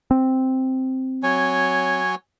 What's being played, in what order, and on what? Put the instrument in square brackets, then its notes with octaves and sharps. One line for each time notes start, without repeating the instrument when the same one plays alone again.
[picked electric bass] C4
[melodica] F#3 C#5 G#5